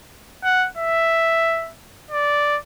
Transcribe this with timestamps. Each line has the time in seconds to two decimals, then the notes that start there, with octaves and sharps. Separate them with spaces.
0.44 F#5
0.77 E5
2.11 D5